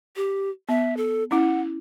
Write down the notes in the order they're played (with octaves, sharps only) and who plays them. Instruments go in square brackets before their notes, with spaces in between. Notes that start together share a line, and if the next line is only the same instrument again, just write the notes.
[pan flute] G4
[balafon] B3 [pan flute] E5
[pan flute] A4
[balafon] C#4 E4 [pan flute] F#5